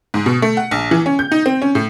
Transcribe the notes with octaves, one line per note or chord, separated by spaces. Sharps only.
G#2
B2
A3
F#5
A#1
E3
C#4
G6
D#4
C4
C#4
A2